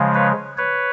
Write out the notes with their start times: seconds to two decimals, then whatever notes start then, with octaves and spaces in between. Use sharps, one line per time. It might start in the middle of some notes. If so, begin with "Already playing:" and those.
Already playing: C#3 F3 G#3
0.14 B4 C#5
0.58 B4 C#5